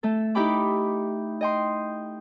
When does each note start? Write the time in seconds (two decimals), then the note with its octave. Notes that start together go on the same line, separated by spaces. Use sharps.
0.03 A3 A4
0.35 D#4 E4 G4 G5 B5 D6
1.41 D#5 G5 C6